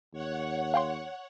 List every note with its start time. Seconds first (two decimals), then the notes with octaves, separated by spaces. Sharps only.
0.13 D#2 C#5 F#5
0.74 F5 G5 C6